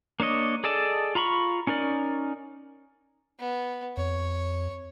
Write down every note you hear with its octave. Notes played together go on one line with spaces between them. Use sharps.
A#3 D4 C#5 D#5
G#4 A4 D5 D#5 A5
F4 A#5 B5 C#6
C#4 D#4 A#4 D5
B3
F2 C#5